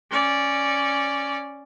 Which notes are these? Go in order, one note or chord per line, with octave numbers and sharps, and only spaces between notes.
C#4 D5